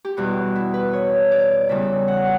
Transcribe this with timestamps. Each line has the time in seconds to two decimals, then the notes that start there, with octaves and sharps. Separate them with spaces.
0.05 G4
0.17 E2 B2 G3 F#4
0.55 E4
0.74 B4
0.93 C#5
1.31 D5
1.69 E2 C#3 G3 E5
2.08 F#5